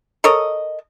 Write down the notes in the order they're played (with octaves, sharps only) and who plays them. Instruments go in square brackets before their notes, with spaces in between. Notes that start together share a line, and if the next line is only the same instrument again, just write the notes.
[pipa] A4 A#4 C#5 D#5